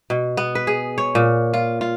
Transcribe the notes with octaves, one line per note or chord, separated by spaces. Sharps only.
B2
B3
B4
G#4
C#5
A#2
F4
F4